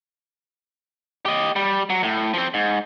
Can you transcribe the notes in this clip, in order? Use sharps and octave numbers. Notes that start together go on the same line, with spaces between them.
G4 D#5
G3
F#3
A2
F3 C4
G#2